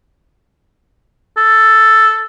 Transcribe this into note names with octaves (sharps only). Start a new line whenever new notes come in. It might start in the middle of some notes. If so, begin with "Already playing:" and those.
A4